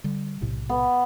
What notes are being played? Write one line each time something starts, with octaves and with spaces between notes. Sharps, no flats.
D3 G3
B1 A2 C3
B3